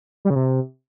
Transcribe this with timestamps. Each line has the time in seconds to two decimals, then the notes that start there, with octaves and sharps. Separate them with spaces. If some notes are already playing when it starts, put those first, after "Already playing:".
0.25 G3
0.30 C#3
0.36 C3